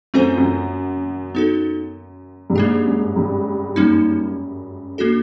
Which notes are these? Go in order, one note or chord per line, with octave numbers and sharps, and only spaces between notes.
F#2 A3 C4 F4 A4 C5
F#2
B3 D#4 F#4 A4
G2
G#2 A#3 D4 G4
F#2
G2
F#2 G3 A#3 D#4
A#3 D4 F#4 A4